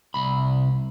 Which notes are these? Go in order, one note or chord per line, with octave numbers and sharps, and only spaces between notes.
C2 B5